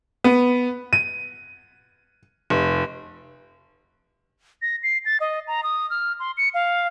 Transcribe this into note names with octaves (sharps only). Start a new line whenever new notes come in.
B3
D#7
F1
A#6
C7
A6
D#5
A#5
D#6
F6
C6
C#7
F5